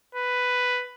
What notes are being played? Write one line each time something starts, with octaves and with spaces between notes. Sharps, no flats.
B4